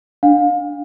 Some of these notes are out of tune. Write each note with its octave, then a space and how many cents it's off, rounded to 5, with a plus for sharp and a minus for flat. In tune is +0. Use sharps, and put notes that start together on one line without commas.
D4 +0 F5 +30